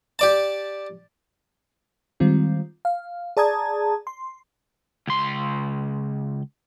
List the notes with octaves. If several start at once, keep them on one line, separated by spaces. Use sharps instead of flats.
G4 D5 A5
D#3 G3 G#3 C4 F4
F5
G#4 D5 A5 A#5 D#6 G#6
C6
C#2 C6